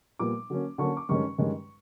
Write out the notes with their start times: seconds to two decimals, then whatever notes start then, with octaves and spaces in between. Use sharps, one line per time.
0.19 A#2 G3 B3 D6
0.50 D3 F#3 A#3 C#4
0.78 D3 F#3 A#3 C#4 C#6
0.97 D6
1.09 G2 D#3 G#3 C#4 C#6
1.38 G2 D#3 G#3 C#4